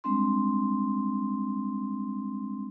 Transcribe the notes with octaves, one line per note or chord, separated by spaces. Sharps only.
G3 G#3 C4 D4 C6